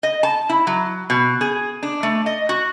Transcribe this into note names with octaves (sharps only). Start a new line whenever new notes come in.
D#5
A5
E4
F#3
B2
G#4
D4
A3
D#5
F#4